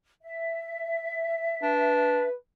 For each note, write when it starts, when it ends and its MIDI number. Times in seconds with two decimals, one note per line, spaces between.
0.22 2.28 76
1.63 2.23 62
1.63 2.35 71